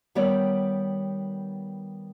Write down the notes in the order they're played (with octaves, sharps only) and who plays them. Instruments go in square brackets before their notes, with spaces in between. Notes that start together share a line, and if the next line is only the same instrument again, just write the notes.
[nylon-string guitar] D#3 G3 B3 G4 C#5 D5